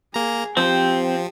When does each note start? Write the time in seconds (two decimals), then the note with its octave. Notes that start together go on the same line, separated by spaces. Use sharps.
0.14 A#3 G#4 A#5
0.57 F3 C4 G4 G5